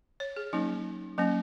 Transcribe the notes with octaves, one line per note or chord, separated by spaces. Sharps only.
C#5
G#4
F#3 A#3 C#4 D#4
F#3 A#3 C#4